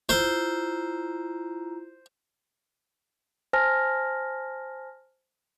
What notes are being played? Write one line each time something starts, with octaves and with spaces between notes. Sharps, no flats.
E4 F4 C5 A#5
C5 G#5 A5 F6 A#6